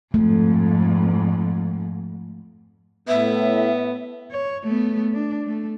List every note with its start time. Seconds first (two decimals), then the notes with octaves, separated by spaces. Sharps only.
0.14 F2 G#2 A3
3.08 A2 B3 E5
4.31 C#5
4.64 A3 B3
5.14 D4
5.46 A3